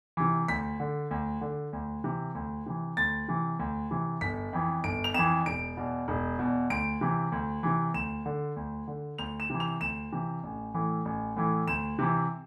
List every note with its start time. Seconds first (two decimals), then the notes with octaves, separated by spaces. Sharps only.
0.17 C3 E3
0.48 D2 B6
0.80 D3
1.11 D2
1.41 D3
1.73 D2
2.04 C3 E3
2.35 D2
2.66 C3 E3
2.97 D2 A6
3.28 C3 E3
3.59 D2
3.91 C3 E3
4.21 G1 B6
4.53 F2 E3
4.84 G1 D7
5.04 F7
5.14 F2 E3 E7
5.46 E1 D7
5.77 E2 B2
6.08 E1
6.39 E2 B2
6.70 D2 D7
7.01 C3 E3
7.32 D2
7.63 C3 E3
7.94 D2 E7
8.26 D3
8.56 D2
8.88 D3
9.18 D2 F7
9.40 E7
9.50 C3 E3
9.60 F7
9.81 D2 E7
10.12 C3 E3
10.43 A1
10.74 A2 E3
11.05 A1
11.37 A2 E3
11.68 D2 E7
11.99 C3 E3